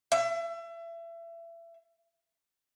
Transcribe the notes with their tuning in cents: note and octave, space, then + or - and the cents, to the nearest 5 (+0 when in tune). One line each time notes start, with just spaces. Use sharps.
E5 +30